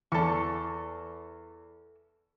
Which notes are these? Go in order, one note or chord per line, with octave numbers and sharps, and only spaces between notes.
E2 A4 C#6